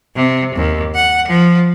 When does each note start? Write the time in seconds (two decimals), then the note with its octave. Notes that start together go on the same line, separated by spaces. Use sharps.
0.15 C3
0.55 D#2
0.95 F#5
1.28 F3